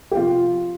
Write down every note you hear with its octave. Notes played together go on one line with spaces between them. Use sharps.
G4
C3 F3 F4